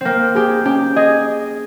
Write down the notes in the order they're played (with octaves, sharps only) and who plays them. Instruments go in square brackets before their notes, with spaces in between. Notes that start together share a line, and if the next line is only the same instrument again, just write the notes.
[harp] A#3 C4 [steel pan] G5
[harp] G4 [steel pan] G#4
[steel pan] C#4 [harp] G4
[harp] G#4 [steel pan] D#5